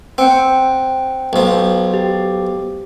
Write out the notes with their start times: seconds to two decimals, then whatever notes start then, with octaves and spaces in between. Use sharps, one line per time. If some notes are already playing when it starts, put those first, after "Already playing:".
0.18 C4 F#5 G5
1.33 B1 F3
1.94 G4